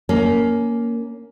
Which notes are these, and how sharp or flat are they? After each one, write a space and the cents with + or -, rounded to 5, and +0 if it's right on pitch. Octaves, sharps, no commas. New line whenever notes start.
A#3 +0 C#4 +20